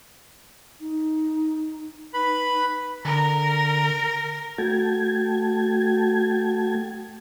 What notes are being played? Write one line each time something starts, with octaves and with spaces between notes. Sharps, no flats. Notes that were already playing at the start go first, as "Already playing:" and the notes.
D#4
D#4 B4 B5
D3 A#4 A#5
A3 F#4 G5 A5 G#6